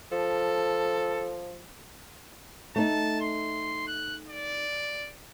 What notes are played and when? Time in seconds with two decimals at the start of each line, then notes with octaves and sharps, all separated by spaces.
0.11 F3 A4
2.76 A3 D#4 A5
3.21 C6
3.87 F#6
4.28 D5